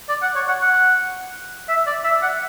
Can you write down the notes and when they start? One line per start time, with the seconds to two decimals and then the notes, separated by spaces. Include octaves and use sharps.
0.09 D5
0.22 F#5
0.36 C#5
0.48 F#5
0.62 F#5
1.69 E5
1.87 D5
2.04 E5
2.23 F#5